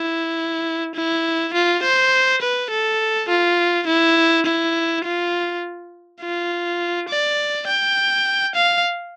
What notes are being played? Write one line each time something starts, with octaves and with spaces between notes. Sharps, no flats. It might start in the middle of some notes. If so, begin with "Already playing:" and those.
Already playing: E4
E4
F4
C5
B4
A4
F4
E4
E4
F4
F4
D5
G5
F5